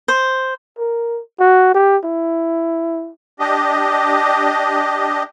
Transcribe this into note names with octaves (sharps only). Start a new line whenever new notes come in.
C5
A#4
F#4
G4
E4
D4 G4 D#5